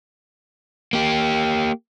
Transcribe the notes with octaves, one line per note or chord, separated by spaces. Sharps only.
A#3 G4